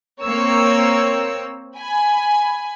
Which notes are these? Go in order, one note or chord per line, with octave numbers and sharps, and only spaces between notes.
A#3 C4 A#4 C#5 E6
G#5 B5